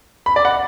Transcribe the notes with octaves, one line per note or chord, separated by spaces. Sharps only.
B5
D5
F#5